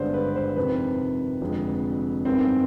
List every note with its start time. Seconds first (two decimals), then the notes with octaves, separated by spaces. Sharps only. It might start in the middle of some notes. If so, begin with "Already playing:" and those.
Already playing: G#1 G2 D3 G#3 B3 C5 D5
0.14 B4
0.36 C5
0.56 F2 C3 D#3 B4
1.41 F1 F2 D3 G#3
2.25 G2 D#3 B3 C4